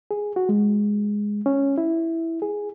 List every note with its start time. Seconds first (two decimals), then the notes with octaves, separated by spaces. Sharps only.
0.11 G#4
0.36 F#4
0.49 G#3
1.46 C#4
1.78 E4
2.42 G#4